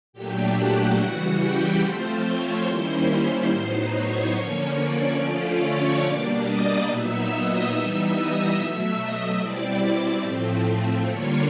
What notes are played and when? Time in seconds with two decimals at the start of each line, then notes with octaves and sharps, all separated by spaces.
0.13 A#2 F#3 A3 D4 G4 G5
0.55 F#4 F#5
0.97 C#3 E3 G3 F#4 F#5
1.39 G4 G5
1.81 F3 A3 C4 F4 C5 C6
2.23 C#5 C#6
2.66 D#3 G3 A#3 C#4 E4 C5 C6
3.49 A2 F#3 B3 D#4 C5 C6
3.91 C#5 C#6
4.34 D3 F3 A#3 C#4
4.75 D5 D6
5.18 D3 F3 A3 C#4 F4 D5 D6
5.60 C#5 C#6
6.02 B2 G3 A#3 D4 D5 D6
6.43 D#5 D#6
6.86 A#2 F#3 B3 D#4 E5 E6
7.28 D#5 D#6
7.70 E3 G3 B3 D#4 E5 E6
8.12 D#5 D#6
8.54 B2 F#3 A3 E5 E6
8.96 D#5 D#6
9.38 B2 G3 C4 E4 D5 D6
10.22 A2 F3 A3 C4
11.06 D3 G3 A#3 D4 F4 C#5 C#6